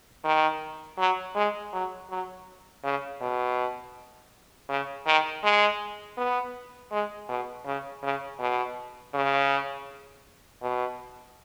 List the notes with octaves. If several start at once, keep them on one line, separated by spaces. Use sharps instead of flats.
D#3
F#3
G#3
F#3
F#3
C#3
B2
C#3
D#3
G#3
B3
G#3
B2
C#3
C#3
B2
C#3
B2